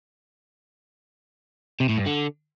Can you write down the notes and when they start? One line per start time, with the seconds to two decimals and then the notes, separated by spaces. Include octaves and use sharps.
1.80 C3
1.89 A2
1.97 G2
2.06 D3